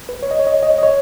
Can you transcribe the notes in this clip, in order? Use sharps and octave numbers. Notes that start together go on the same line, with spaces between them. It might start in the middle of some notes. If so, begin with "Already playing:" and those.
B4
C#5
D#5
C#5
D#5
C#5
D#5
C#5
D#5
C#5